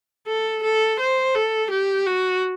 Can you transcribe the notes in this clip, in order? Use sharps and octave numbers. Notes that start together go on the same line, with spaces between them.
A4
A4
C5
A4
G4
F#4